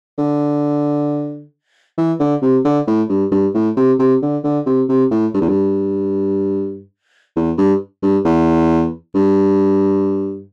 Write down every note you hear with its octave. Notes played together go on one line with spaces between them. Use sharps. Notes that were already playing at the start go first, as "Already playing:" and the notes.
D3
E3
D3
C3
D3
A2
G2
G2
A2
C3
C3
D3
D3
C3
C3
A2
G2
E2
G2
E2
G2
G2
E2
G2